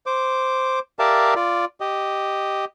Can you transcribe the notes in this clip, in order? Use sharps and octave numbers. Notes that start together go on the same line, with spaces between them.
C5 D6
G4 A#4 D5 E5 F5 A5
F4 D5
G4 D#5